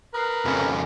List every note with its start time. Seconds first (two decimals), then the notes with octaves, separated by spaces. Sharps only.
0.14 A#4 B4 D#6 F#6 C7
0.45 F2 C#3 A4 G#5 B5
0.58 D#5 G#5